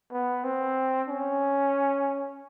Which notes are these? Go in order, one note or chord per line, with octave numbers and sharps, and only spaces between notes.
B3
C4
C#4